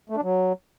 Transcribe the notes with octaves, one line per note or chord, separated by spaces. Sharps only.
A3
D4
F#3